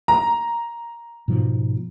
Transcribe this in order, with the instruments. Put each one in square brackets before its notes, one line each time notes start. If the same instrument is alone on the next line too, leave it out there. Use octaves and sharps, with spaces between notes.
[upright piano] A#5
[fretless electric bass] G#2 B2 F3